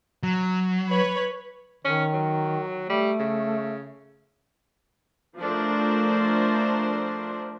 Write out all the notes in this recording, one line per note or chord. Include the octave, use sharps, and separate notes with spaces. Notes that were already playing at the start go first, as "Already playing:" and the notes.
F#3
B4 C#5 B5
D#3 C#4
F#3
G3 A3
C#3
F3 A3 D4 A#4 C5